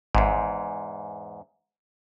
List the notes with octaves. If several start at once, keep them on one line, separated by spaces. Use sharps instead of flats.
G#1 E2 G#2